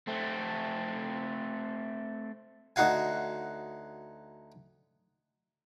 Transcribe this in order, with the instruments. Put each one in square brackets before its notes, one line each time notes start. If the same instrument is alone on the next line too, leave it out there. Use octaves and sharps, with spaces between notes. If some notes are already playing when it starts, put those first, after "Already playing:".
[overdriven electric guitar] A3 C4
[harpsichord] D2 D#4 F#4 F5 G#5